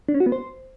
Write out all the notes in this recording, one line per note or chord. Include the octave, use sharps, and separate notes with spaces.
D4
C#4
F#4
B3
C5